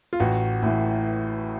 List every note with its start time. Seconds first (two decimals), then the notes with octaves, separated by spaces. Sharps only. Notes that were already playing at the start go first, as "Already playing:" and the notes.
0.13 F4
0.20 A1 F#4
0.62 A2 E3